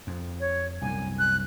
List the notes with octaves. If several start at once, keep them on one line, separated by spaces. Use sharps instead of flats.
F2
C#5
C2 F#2 G#5
F#6